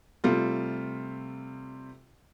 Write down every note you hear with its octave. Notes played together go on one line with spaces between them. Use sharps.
C3 G3 A3 F4